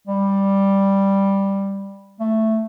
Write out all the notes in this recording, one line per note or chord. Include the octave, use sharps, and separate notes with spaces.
G3
A3